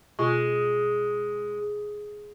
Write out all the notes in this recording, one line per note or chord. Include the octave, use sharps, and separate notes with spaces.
B2 G#3 F4 C#6